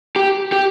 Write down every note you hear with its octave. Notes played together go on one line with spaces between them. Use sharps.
G4
G4